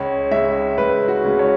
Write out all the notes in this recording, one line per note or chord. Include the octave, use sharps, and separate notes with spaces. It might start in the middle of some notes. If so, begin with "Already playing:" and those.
Already playing: C#2 C#5
C#3 G#3 E5
C#2 B4
F#4
C#3 G#3
C#5